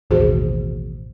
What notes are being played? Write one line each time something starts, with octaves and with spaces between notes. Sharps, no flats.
A1 D#2 B2 F#4 G#4 C5